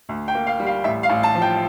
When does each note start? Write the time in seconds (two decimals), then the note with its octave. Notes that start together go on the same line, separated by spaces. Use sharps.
0.09 D2
0.28 G5
0.35 A#3
0.47 F5
0.60 G3
0.66 F5
0.84 A1 E5
1.03 F5
1.09 A1
1.23 A5
1.35 F3
1.42 G5